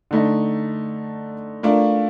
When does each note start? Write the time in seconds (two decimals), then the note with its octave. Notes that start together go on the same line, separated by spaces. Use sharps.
0.11 D3 A3 D#4
1.63 A3 D4 F4 A#4